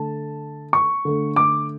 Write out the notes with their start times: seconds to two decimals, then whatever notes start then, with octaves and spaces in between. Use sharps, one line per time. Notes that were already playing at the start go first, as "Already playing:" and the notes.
Already playing: D3 A3 A5
0.73 C#6
1.05 D3 A3
1.36 D6